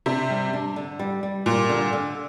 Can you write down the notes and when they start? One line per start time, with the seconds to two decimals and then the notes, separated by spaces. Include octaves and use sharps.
0.06 C3 D4
0.30 G3
0.53 D4
0.76 D3
0.99 G3
1.23 G3
1.46 A#2 G3
1.69 D3
1.93 D3